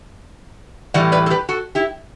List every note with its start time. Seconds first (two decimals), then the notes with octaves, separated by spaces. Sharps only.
0.94 A2 E3 G3 D5 F#5
1.12 B4 D5
1.26 A4
1.30 G4 B4
1.49 F#4 A4
1.75 E4 G4